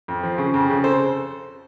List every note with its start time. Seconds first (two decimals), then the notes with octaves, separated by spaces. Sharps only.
0.08 F2
0.23 F3
0.38 C#3
0.54 F2
0.70 C#3
0.84 A4 C5